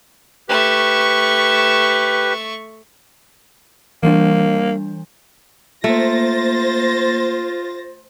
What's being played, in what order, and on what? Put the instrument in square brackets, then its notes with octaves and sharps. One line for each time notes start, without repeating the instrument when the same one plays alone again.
[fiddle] A3 C#6 [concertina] G4 B4
[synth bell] E3 G3 D4 [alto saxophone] A#3
[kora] A3 [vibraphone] A#3 [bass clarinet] F4 [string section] C5 A6 A#6